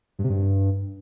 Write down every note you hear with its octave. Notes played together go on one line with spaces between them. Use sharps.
G2
C3
G2